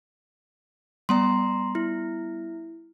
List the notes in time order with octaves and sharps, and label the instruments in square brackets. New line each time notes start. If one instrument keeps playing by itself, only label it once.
[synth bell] G3 B3 D5 [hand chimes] A#5 C6
[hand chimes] E4